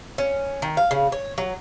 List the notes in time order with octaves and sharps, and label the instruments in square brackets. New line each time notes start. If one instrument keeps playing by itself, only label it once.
[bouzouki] C#4
D#3
F5
C#3
C#5
F#3